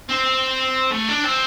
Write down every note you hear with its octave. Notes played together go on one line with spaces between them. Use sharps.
C4
A3
D4
C4